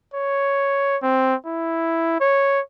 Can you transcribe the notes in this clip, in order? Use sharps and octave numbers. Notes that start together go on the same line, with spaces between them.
C#5
C4
E4
C#5